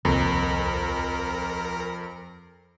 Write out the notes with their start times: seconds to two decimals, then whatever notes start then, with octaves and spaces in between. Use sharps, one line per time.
0.05 D#1 C2 F2 A#4